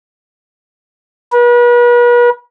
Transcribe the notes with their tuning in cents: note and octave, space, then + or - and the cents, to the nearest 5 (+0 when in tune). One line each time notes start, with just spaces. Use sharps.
B4 -40